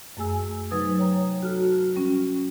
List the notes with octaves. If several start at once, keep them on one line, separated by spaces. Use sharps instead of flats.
F#2 A3 G#4 G#5 E6
C3 F#3 D#4 B4 D#6 G#6
C#5 G5 A#5
F#4 A4 A5 F6
G3 C#4